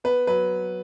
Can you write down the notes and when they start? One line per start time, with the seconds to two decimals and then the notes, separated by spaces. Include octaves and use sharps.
0.04 B3 B4
0.27 F#3 B4